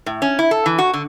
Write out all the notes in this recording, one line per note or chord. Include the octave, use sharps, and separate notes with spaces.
A2
C#4
E4
A4
E3
F#4
D3